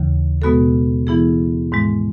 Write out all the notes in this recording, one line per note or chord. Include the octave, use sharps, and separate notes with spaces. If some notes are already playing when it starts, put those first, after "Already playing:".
Already playing: D#2 C#3 E3
B2 G#3 B3 F#4 A4
E3 B3 E4 G#4
G#2 D#3 G#3